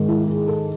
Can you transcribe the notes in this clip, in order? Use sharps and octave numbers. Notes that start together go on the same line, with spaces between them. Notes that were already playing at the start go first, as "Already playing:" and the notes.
Already playing: G#2 D#3
E4
G#4
A4